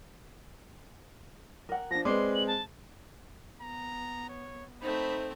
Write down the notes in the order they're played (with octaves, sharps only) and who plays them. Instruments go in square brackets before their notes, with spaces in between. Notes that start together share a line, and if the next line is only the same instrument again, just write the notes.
[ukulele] A#4 F#5
[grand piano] F3 D4 [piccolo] A#6
[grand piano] G#3 C4 [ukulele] B4 D5 [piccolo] C6
[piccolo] F#7
A5
[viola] B3 [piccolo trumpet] A#5
[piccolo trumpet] C#5
[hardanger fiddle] A3 C4 [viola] D#4 [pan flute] C5 [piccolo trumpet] B5